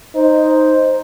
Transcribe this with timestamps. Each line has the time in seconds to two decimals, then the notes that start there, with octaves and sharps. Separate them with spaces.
0.15 D#4 C5